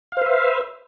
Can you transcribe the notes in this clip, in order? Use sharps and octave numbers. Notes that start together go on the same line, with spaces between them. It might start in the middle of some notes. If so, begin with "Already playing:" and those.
B4 C5 E5 F5